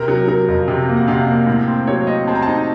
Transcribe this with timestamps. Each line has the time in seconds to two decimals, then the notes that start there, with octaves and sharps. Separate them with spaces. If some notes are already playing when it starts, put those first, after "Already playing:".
Already playing: C3 A#4
0.08 F#3
0.28 F#3 A#4
0.48 F2
0.68 C3
0.88 A#3
0.97 F#5
1.07 C3 F5
1.28 A#3
1.47 A2
1.67 C4
1.87 F#3 C#5
2.07 C4 D#5
2.28 C4 A5
2.35 A#5
2.42 D#4 A5